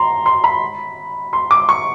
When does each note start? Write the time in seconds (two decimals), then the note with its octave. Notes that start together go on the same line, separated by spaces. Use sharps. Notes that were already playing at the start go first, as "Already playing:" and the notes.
Already playing: A#5 C6
0.26 C6
0.44 B5
1.33 C6
1.51 D6
1.69 C#6